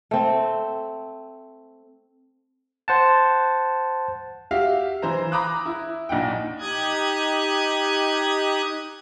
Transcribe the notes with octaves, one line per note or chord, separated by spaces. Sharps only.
A3 C4
C5 F#5 A5
F#4 G4 E5 F5
E3 C5 A#5
A#5 B5 D6 D#6 F#6
E4
A#1 D#4 F#5 G5
D#4 G4 D#6 F#6 G#6